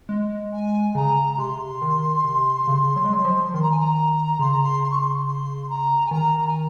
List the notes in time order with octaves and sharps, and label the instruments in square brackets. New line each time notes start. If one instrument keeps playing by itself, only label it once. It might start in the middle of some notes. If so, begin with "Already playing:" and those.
[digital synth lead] G#3
[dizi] G#5
[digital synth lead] C#3 [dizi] A#5
[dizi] A#5
[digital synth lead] C3 [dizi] C6
[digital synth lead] D#3
C3
C#3
F#3
G#3
F#3
F3
[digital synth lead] D#3 [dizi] C6
[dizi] A#5
G#5
A#5
[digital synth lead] C#3 [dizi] C6
[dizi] A#5
C6
C6
C#6
C6
C6
A#5
G#5
[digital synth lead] D#3 [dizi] A#5
[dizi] G#5